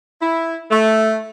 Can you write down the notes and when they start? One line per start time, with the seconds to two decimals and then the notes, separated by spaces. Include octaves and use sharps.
0.22 E4
0.71 A3